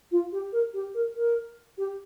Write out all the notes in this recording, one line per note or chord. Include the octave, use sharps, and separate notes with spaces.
F4
G4
A#4
G4
A#4
A#4
G4